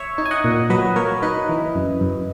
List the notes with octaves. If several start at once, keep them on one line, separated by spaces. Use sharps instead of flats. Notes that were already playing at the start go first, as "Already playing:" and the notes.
Already playing: C#5 E5
D#4
G#5
D#5 F#5
A#2
F#3 B4 D#5
A#3 A#4 C#5
D#4 B4 D#5
E3
F#2
F#2